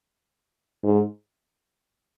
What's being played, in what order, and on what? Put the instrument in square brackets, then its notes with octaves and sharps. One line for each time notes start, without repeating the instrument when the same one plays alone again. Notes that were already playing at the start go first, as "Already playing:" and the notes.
[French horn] G#2